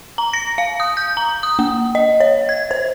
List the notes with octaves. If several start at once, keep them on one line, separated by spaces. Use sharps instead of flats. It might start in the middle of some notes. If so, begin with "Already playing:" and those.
A#5
A#6
F5
D#6
G6
A#5
D#6
A#3
D#5
C#5
G#6
C5